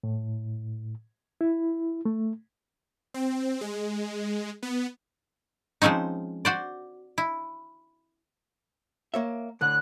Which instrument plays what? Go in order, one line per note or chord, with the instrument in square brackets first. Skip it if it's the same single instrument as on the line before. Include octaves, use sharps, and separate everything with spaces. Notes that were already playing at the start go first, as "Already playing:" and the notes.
[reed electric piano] A2
E4
A3
[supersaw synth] C4
G#3
B3
[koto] F3 G#3 C4 C#4 D#4
F#4 C5 D5
E4
[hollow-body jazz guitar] A#3 C#5 E5
[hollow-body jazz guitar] A2 D3 [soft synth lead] F#6